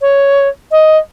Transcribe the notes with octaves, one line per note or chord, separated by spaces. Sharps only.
C#5
D#5